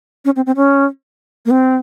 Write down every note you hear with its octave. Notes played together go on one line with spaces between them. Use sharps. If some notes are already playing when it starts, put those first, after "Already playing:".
C#4
C4
C4
C#4
A#3
C4